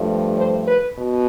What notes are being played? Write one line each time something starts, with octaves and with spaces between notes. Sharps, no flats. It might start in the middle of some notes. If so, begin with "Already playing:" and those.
Already playing: G2 F3 A3
C5
B4
B2